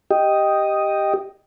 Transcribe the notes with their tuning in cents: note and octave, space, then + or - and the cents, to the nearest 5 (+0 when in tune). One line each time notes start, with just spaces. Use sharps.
G4 +0 D#5 +0